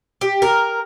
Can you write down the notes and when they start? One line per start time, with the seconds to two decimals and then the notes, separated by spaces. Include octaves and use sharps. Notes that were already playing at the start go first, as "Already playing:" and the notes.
0.21 G4
0.42 A#4